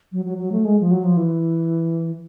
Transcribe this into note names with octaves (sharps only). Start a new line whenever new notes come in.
F#3
F#3
F#3
A3
G#3
F3
F#3
F3
E3